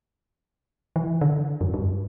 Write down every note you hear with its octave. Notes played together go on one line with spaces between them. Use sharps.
E3
D3
F#2
G2